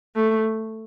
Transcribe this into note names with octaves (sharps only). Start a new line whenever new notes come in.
A3